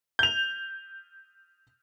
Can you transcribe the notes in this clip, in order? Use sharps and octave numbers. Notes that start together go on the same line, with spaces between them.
G6 F7